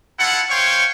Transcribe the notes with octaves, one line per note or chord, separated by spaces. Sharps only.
E4 F4 A4 F#5
C5 C#5 F5 G5 C#6